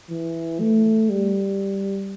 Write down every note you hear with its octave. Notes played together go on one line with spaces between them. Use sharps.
E3
A3
G3